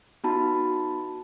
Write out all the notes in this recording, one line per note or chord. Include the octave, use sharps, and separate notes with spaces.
B3 D#4 F#4 A5 B5